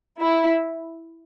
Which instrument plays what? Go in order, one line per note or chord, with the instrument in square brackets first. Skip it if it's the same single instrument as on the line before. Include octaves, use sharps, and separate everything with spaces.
[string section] E4